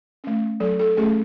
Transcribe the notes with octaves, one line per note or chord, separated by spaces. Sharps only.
A3 C#4
F#3 A4
A4
A3 C#4 G#4